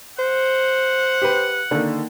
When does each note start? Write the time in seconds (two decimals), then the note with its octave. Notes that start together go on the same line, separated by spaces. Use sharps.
0.19 C5 F#5
1.22 G4 B4
1.71 D3 D#3 A#3